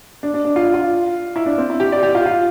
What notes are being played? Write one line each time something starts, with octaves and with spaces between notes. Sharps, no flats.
D4
D4
D4
F4
F4
E4
D4
C4
E4
G4
D5
G4
F4
F4